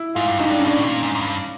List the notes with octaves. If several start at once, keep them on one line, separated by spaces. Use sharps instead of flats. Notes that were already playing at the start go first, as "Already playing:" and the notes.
Already playing: E4
G#2 F4
G2
F#2 D#4
G2 D4
C#4
A2 D4
B2
A#2
G#2
G#2
G2